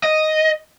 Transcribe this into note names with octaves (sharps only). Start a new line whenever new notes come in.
D#5